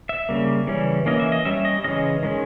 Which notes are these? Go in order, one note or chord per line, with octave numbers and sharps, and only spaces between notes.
E5
C#3 G3 A#3
C#3 E3 G3 C#4
E3 A#3 C#4 D#5
E5
D#5
G3 C#4 E5
D#5
C#3 E3 G#3 C#4 D#5
D#3 G#3 C#4